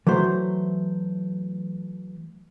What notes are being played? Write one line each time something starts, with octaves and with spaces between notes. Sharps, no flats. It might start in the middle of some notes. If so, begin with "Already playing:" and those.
E3 F#3 A3 C5